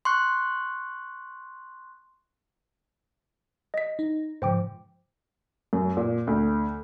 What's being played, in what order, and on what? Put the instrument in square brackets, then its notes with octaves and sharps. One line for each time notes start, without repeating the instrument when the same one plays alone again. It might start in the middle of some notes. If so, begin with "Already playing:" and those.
[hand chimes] C6 C#6 F#6
[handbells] D#5 B6
[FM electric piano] D#4
[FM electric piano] G#2 C#3 F3 [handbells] C5 G5 D6
[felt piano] F#2
A#2
D2